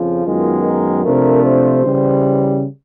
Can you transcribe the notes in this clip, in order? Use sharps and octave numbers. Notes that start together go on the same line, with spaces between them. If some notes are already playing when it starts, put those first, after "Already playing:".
Already playing: F2 C#3 F3 F4
F#2 D#3 G#3 B3
A#4
C3 F3 A3 D4 A#4
C5
C#3 E3 G3